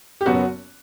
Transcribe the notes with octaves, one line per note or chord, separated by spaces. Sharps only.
G4
F#1 F#2 F#3 B3 F#4